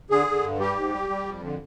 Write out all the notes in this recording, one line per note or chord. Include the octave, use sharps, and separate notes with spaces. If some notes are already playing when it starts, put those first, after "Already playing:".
D3 G#4
D3
G2
G3 G4
G#2
G3
G3
F2
D3